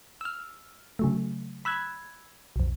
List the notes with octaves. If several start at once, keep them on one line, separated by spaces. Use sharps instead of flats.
E6 F6
C#3 F#3 A3
B5 E6 F#6 G#6
B1 F2